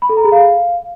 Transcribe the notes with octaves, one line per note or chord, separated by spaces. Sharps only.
B5
A4
A#5
G#4
F5